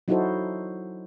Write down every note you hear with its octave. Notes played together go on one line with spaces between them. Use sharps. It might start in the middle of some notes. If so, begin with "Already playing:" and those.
F#3 D#4 E4 F#4 A4 C5